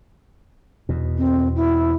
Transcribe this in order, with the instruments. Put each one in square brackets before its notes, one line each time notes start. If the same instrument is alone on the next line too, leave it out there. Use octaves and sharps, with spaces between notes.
[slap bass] E2 B2
[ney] C4
E4